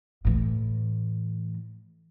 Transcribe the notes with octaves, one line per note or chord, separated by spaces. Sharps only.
A2 E3